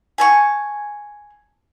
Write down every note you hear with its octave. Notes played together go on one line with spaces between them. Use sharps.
G#5 A5 C#6